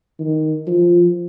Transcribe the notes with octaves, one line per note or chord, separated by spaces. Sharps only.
D#3
F3